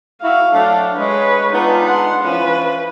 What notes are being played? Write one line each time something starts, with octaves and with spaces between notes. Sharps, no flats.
E4 F#4 E5 F5
F#3 A3 D4
G#3 B4 C#5
G#3 B3 D4 D#4 F4
F#5 C6
E3 F3 C#4 B4